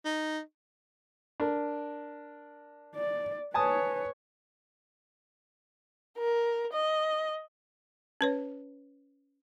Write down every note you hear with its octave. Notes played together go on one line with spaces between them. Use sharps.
D#4
D4 A#4
D5
B4 C#5 G#5 A5 D#6
A#4
D#5
C#4 B4 C#5